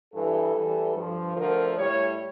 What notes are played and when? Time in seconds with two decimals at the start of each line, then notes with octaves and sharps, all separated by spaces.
0.14 G2 E3 G3 A4
0.55 E2 E3 G3
0.96 G2 F3
1.37 D2 D3 F3 A#4
1.77 A2 G3 C#5